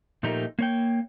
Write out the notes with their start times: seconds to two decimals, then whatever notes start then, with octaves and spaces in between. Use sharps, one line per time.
0.23 A#2 F3 A3 D#4 G4 A#4
0.59 A#3 C#5 G5